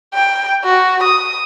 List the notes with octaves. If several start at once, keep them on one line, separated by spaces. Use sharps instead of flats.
G5
F#4
D#6